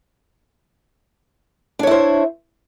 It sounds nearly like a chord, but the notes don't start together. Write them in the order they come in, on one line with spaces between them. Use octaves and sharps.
D4 C#5 E4 C5